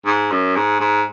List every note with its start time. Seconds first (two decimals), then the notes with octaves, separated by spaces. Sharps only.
0.06 G#2
0.31 F#2
0.56 G#2
0.80 G#2